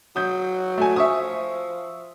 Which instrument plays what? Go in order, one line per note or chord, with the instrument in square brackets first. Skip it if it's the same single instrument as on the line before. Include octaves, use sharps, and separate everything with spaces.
[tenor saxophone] F#3 [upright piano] D#6 G6
[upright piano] A3 F#4 G#5
[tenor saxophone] F3 [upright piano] E5 C#6 D#6